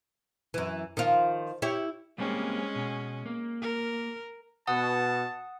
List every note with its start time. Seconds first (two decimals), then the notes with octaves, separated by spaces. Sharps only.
0.54 F#2 E3
0.97 D#3 F3 F4
1.62 E4 G4 C#5
2.18 G3 G#3 A#3 C4 C#4
2.75 B2
3.26 A#3
3.62 A#4
4.67 B2 F#5 A5 D#6